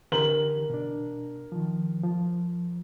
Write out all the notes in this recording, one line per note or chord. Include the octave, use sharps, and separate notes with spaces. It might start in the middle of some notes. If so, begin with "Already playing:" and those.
D3 E3 G4 A#4 F#7
B2 D4
D#3 F3
F3